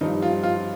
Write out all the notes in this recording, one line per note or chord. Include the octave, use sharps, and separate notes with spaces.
G2 F3 D#4
F4
F4